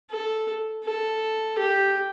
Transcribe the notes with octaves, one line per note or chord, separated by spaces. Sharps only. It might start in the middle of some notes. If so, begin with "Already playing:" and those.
A4
A4
G4